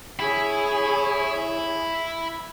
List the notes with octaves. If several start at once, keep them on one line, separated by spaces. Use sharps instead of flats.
E4 G#4 C#5